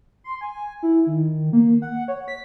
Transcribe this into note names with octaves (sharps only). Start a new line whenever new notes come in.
C6
G#5
E4
D#3
A#3
F#5
C#5
B6